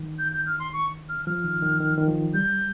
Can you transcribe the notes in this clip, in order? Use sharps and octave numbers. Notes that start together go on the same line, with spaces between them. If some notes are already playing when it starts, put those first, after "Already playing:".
Already playing: D#3
G6
G6
F6
C6
C#6
F6
F3 F6
D#3
D#3
D#3
D#3
F3
G3 G6